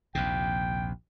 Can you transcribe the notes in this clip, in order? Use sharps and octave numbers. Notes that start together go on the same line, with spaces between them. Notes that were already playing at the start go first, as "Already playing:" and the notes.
A#1 D#2 C3 G5